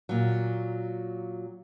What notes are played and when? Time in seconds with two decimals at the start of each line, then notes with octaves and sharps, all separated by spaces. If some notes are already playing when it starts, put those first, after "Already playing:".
0.09 A#2 F#3